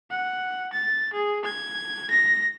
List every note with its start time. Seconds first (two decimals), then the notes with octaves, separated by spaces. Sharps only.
0.10 F#5
0.73 A6
1.13 G#4
1.44 G#6
2.10 A#6